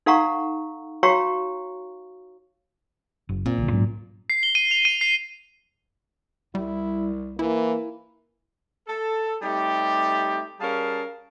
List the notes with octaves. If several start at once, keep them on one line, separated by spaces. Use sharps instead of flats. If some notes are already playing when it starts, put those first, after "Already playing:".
D#4 A4 F5 F#5 A#5 C#6
F#4 C#5 F5 G5 A#5 C#6
F#1
A#2 C4
A#1 D3
G#2 F#3 C#4
C7
G7
D#7
F7
D#7
C7
C2 G3 E4
E3 A#3 E4
A4
G3 A3 C4 D#4 G4
G3 C#4 G#4 A#4 F5 A5